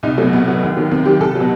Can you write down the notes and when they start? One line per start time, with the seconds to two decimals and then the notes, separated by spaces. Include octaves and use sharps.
0.03 C2 D#4
0.17 B2 F#3 A3
0.33 C2 B3
0.48 B2 F#3
0.63 D#2
0.76 D#3 F#3
0.91 D#2 C4
1.05 D#3 F#3 G4
1.20 C2 A4
1.35 B2 F#3